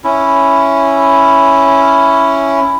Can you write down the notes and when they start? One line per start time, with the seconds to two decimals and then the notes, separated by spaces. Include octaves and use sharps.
0.04 C#4 E4